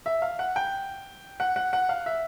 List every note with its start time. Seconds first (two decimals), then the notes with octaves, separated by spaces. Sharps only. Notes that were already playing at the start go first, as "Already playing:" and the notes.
0.06 E5
0.22 F5
0.39 F#5
0.56 G5
1.40 F#5
1.56 F#5
1.73 F#5
1.89 F5
2.06 E5